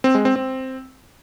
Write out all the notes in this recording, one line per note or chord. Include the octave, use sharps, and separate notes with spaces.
C4
G#3
C4
C4